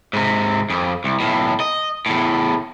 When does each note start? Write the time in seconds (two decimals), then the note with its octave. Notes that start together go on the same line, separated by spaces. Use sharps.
0.13 G#2 C3
0.70 F2
1.04 C2
1.20 B1 A2
1.60 D#5
2.06 E2 A2